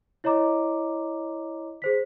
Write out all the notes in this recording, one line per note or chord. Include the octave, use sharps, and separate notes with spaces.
E4 C#5 D#5 A#5 D6
G#4 C5 B6